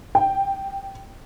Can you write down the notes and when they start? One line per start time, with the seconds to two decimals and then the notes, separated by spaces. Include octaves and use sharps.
0.15 G5